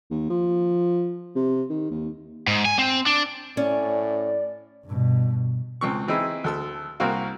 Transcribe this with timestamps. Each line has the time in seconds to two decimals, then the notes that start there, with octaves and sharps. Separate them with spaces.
0.11 D#2
0.30 F3
1.35 C3
1.70 D#3
1.90 D#2
2.47 G#2
2.65 G#5
2.78 C4
3.06 D4
3.57 A2 C#4 D5
4.85 G2 B2
5.81 C#2 C4 C#6
6.08 E3 C4 D#4 E4 G#4
6.44 D2 A4 E6
7.00 C2 A#3 C4 F#4 F5